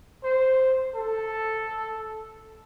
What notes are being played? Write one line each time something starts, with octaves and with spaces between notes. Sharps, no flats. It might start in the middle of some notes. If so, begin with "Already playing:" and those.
C5
A4